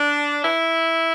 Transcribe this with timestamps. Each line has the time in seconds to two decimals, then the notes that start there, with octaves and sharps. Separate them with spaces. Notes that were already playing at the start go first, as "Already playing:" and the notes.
Already playing: D4
0.42 E4